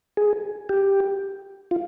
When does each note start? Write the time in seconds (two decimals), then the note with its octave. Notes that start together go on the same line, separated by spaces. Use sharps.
0.17 G#4
0.69 G4
1.71 F4